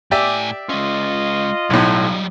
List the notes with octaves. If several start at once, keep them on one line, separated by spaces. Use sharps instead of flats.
A2 G4 D5 E5 G#5
G#3 C#4 F4 D#5
B1 A2 F#3 G3